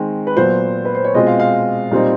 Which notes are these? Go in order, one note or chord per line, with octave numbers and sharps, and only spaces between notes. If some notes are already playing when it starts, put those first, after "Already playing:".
Already playing: D#3 G#3 C4
B4
A#2 F#3 B3 C5
B4
C5
C#5
B2 G#3 C4 F4 D#5
F5
F5
A#2 G3 C4 D#4